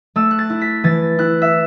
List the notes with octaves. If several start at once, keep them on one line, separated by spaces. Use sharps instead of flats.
A3 E6
F#6
A6
E4
B6
E3 A6
E4 F#6
E5